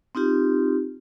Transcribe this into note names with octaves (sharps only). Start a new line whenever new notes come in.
C4 D#4 F4 G4